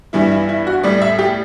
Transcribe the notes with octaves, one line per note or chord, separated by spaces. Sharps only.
G2 E3 G3 E4
E4
E4
F#4
A2 G3 D5
E5
G4